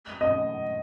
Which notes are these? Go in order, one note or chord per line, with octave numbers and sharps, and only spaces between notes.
D#5